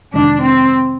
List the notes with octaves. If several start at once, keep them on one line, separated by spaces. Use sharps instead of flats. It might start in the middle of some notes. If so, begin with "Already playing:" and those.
F2 C3 D#3 G#3 D4
C4